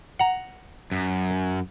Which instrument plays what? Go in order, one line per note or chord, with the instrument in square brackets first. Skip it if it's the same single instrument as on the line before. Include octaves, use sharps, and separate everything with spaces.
[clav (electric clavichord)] F#5 A#5
[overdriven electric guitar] F#2